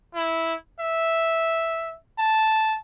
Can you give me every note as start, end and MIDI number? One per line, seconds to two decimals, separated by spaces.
0.15 0.55 64
0.80 1.96 76
2.18 2.77 81